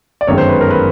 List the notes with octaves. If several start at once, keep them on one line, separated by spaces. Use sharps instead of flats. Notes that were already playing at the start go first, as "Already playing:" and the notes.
D5
G1 F#2 D#3 G#3 C#5
C5
B4
A#4
B4